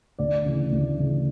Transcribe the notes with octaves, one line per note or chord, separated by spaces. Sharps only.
D2 D5
C#3 E3
D2
C#3 E3